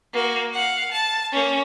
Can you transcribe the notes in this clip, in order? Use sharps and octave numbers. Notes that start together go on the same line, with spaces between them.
A#3 F#4
F5 F#5
A5
A#3 C#4